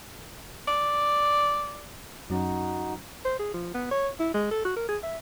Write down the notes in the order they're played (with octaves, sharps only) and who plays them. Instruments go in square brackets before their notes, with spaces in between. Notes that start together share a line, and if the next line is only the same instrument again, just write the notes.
[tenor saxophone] D5
[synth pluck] F#2 F#3 C#4 [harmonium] D#4 F#4
[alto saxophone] C5
G#4
F3
B3
C#5
E4
G#3
A4
F#4
A#4
G#4
E5